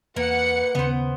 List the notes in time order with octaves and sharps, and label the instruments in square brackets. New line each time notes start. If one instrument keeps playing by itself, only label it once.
[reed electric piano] E2 [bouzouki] A#3 [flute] B4 [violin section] F#5 C#7
[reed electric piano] D#2 C#3 [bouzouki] B3 C5